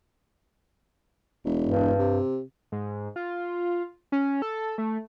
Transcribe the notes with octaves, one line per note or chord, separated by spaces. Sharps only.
E1
G2
C3
G#2
F4
C#4
A4
A3